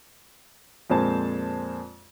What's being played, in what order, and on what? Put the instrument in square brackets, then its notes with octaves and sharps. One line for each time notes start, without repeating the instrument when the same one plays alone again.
[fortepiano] F2 A#2 G#3 C5 A5